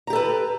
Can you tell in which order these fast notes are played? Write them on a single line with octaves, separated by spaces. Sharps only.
A#5 G4 A4 B4